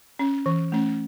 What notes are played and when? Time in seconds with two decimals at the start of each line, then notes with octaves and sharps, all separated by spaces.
0.19 C#4
0.46 E3
0.72 A3 C#4